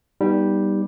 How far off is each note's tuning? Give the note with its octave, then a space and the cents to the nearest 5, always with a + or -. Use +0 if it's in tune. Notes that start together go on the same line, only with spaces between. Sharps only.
G3 +0 B3 -25 D#4 +0